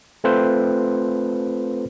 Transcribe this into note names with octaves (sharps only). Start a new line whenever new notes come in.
A3 C4 F4 A4 B4 C5